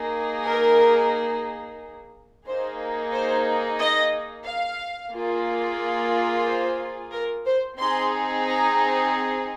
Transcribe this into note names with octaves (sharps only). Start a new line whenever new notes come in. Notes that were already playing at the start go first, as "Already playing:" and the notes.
Already playing: A#3 D#4 G#4
A#4
A#3 D#4 G#4 C5
C5
D#5
F5
A#3 F4 G#4
C5
A#4
C5
C4 D#4 G#4 C6
A#5